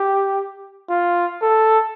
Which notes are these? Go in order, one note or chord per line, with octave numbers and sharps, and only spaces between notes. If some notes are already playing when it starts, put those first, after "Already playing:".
Already playing: G4
F4
A4